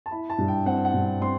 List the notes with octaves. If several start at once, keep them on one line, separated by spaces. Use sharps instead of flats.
A5
E4 B5
A5
G2
G5
C4 F#5
F#5
G2
C4 C6